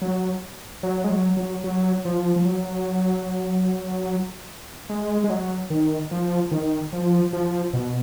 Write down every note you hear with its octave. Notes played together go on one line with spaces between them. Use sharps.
F#3
F#3
G#3
F#3
F#3
F#3
F3
F3
F#3
G#3
G#3
F#3
D#3
F3
D#3
F3
F3
B2